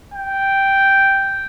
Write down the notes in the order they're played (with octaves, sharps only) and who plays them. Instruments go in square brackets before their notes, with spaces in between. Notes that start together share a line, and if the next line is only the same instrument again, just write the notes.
[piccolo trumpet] G5